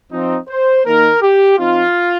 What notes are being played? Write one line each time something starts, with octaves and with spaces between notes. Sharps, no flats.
F3 C4 D#4
C5
D#3 A#3 D#4 A#4
G4
F3 C4 D#4 F4